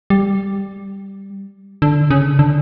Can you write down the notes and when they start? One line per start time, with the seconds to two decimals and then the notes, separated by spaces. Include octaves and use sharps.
0.10 G3
1.82 D3
2.10 C#3
2.39 D3